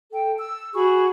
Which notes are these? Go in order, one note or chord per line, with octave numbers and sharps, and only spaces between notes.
A4 G5
E6
F#4 G#4 B5 C#6